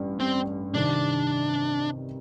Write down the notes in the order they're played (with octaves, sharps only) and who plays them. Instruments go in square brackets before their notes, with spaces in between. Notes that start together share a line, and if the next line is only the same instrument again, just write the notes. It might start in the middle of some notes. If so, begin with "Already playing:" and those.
Already playing: [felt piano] A1 G2
[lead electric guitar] C4
[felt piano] C2 C3 D#3 [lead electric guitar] D4